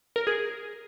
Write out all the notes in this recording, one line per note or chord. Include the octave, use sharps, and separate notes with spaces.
A#4
G#4